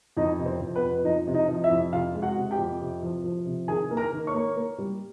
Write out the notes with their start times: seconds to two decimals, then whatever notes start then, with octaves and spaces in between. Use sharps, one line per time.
0.17 F2 D#4 D#5
0.39 C3
0.46 C4 C5
0.61 F2
0.76 B3 B4
0.84 F2
1.04 F3 D#4 D#5
1.27 C3
1.34 D#4 D#5
1.48 F3
1.64 E4 E5
1.70 F2
1.93 C3 F4 F5
2.15 G#3
2.22 F#4 F#5
2.37 C3
2.51 G4 G5
2.58 F2
2.81 C3
3.03 F3
3.24 F3
3.46 C3
3.68 D#3 G#4 G#5
3.91 A#3
3.97 A#4 A#5
4.12 D#3
4.27 C#5 C#6
4.34 A#3
4.56 A#3
4.78 G3